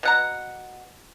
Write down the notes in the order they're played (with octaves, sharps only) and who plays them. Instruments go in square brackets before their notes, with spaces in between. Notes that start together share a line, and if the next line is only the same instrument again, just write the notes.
[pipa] B2 F#5 A#5